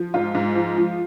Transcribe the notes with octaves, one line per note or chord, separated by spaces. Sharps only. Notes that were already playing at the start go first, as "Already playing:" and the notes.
Already playing: F3
G#2 F4
G#2
F3
F3